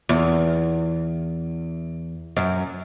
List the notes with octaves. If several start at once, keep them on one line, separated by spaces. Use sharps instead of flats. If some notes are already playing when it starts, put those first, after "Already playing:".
E2
F#2